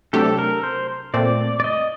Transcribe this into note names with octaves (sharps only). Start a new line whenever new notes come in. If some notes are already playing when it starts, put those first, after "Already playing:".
C3 F#3 A3 D4 G4 A4
A#4
C5
A#2 A3 C4 D5
D5
D#5